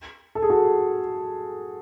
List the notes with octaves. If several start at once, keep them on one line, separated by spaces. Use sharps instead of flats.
A4
G#4
F#4 A4